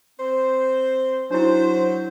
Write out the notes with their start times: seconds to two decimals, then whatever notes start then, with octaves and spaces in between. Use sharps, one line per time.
0.19 C4 C5
1.31 F#3 D4 E4 C5